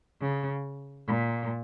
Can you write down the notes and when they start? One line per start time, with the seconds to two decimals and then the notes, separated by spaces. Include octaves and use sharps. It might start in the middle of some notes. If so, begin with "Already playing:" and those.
0.21 C#3
1.07 A#2